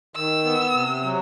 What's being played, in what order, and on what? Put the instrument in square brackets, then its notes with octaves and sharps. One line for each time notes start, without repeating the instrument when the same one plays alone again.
[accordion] D#3 [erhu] E6
[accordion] B3
C3
F#3